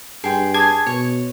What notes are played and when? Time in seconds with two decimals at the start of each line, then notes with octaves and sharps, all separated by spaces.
0.24 G2 G#4 G5 C6
0.54 G#4 A5 D6 G#6
0.86 B2 C#5